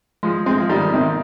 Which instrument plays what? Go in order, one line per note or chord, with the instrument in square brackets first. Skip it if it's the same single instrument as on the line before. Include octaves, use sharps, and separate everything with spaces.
[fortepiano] F3 G#3
G#3 C4
F3
D#3 G3
C3 D#3